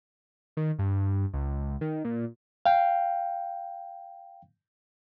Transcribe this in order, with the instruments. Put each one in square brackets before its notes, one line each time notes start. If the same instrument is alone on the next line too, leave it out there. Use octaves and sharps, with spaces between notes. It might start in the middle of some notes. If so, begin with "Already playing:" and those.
[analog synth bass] D#3
G2
C#2
D#3
A#2
[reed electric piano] F5 G5